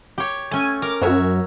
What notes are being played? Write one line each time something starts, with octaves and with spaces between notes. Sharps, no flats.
G4 C#5
A3 C#4 G#5
A#4 D6
F#2 F#4 C#5 E5